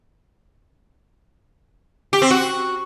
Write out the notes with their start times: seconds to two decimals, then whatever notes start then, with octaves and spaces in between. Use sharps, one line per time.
2.13 G4
2.22 C4
2.31 F#4